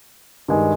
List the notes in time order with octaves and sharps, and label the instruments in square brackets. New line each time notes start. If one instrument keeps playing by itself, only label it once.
[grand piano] G2 D#3 G#3